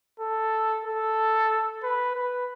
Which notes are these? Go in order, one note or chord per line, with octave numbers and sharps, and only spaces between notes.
A4
A4
B4
B4